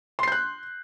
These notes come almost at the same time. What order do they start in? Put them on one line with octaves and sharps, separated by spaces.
C6 C7 G6 F#6